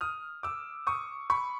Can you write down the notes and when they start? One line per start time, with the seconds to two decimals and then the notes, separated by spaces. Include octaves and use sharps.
0.01 D#6 F6
0.43 D6 E6
0.87 C#6 D#6
1.30 B5 C#6